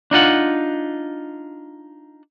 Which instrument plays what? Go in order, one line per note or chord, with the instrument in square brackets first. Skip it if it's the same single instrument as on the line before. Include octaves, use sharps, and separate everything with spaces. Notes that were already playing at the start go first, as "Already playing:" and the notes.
[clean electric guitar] D4 D#4 F4 F#5